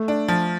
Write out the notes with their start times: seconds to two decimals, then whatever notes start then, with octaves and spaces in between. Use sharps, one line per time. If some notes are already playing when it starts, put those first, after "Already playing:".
Already playing: A3
0.08 D4
0.28 F3